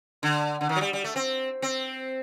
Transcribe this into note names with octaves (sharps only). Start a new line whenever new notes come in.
D3
D3
D#3
F#3
G3
G3
A3
C4
C4